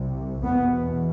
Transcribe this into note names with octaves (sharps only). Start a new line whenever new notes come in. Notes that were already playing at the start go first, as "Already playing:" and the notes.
Already playing: C2 C3
E2 B2 B3